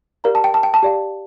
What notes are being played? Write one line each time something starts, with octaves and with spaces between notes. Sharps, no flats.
G4 A#4 D5 F5 A#5
A5
G5
A5
G5
A5
G4 D5 F5